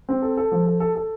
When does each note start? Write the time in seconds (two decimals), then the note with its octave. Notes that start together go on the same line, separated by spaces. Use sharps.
0.09 C4
0.22 A4
0.37 A4
0.52 F3
0.66 A4
0.80 A4
0.95 A4